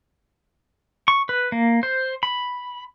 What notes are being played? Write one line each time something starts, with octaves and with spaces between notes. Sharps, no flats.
C#6
B4
A#3
C5
B5